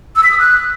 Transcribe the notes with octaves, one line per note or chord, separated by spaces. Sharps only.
E6
B6
D#6
F#6